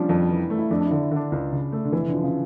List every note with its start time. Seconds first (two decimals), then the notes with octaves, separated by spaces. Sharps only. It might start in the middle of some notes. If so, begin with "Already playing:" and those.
Already playing: F3 G3 A#3 C#4 D4
0.09 F2
0.30 E3
0.50 A3
0.59 E4
0.70 F2 D4
0.81 D4
0.86 E4
0.91 D3
1.01 E4
1.11 D3
1.16 D4
1.32 C#2
1.52 C#3
1.72 A3
1.85 D3
1.93 F1 E3
2.08 D3
2.14 F3
2.23 C#3